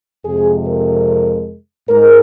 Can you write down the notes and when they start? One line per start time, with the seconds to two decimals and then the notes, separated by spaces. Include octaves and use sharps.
0.24 F2 C3 G#3 G#4
0.66 A#4
1.89 G#2 G#3 A#4